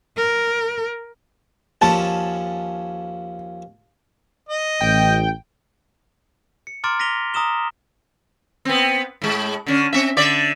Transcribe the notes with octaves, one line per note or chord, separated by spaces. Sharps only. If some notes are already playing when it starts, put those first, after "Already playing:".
A#4
D#2 F3 C#4 A5
D#5
A1 G5
C#7
A#5 C6 D6 F6 A6 D7
A#6 B6 D#7 F7 G7
A#5 D#6 E6 E7 G7
B3 C4
A2 G#3
D3 C#4
C4 E5
D3 D5 E5